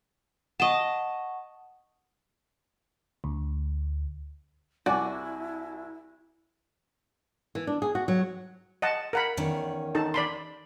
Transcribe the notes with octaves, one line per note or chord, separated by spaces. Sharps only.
D#5 F#5 A5 C#6
D2
C2 E4 F#4 D5 G#5
E3
D4
G#4
F#4
F#3
D#5 F#5 A5
A#4 F#5 B5
E2 D#3 C#4
D#4 A4 A5
D5 B5 C6